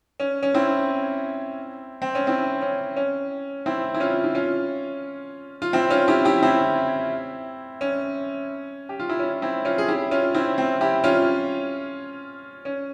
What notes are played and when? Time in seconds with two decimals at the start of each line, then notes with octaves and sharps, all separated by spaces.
0.20 C#4
0.43 C#4
0.54 C4 E4
2.02 C4
2.15 C#4
2.27 C4 E4
2.62 C#4
2.96 C#4
3.66 C4 E4
3.94 E4
4.00 C#4 F4
4.24 E4
4.35 C#4 F4
5.62 F4
5.73 C4 E4
5.90 C#4 F4
6.08 E4 G4
6.25 E4 G4
6.43 C4 E4
7.81 C#4
8.89 G4
8.99 F4
9.09 E4
9.19 C#4
9.42 C4 E4
9.65 C#4 F4
9.78 G#4
9.88 E4 G4
10.11 C#4 F4
10.34 C4 E4
10.58 C4
10.81 E4 G4
11.04 C#4 F4
12.65 C#4